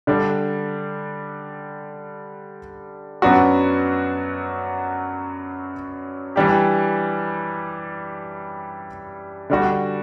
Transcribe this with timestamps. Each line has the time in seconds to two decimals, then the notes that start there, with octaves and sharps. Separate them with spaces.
0.07 D3 G3 D4
3.22 F#2 F#3 B3 D4 F#4
6.36 E3 G3 D4 G4
9.50 D3 G3 D4 F#4